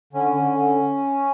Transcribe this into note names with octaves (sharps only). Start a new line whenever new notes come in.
D3 C#4
D3
D3